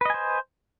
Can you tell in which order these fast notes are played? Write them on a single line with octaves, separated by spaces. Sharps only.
B4 D#5 G#5 C5